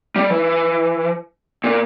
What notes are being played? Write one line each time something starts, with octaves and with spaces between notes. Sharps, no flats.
G3
E3
A#2